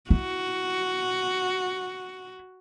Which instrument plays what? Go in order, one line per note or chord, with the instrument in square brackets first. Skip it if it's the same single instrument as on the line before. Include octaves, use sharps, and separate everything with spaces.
[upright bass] E4 [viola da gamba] F#4